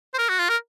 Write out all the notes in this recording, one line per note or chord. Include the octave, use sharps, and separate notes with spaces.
C5
A#4
F#4
F4
A#4